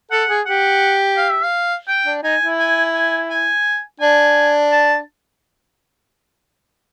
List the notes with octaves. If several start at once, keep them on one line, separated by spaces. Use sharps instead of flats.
A4 F#5
G#4
G4 F#5
F5
E5
F5
G5
D4
D#4 G#5
E4
G#5
G#5
G#5
D4 G#5
A5